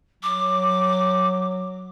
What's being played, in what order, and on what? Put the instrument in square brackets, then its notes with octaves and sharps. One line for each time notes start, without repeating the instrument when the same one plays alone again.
[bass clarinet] F#3 [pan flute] D6